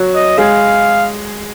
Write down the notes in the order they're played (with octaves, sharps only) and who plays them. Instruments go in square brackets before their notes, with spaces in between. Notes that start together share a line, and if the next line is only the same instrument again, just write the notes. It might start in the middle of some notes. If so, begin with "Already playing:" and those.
Already playing: [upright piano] F#3 F#4
[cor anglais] D#5
[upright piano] G#3 G#4 [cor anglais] F5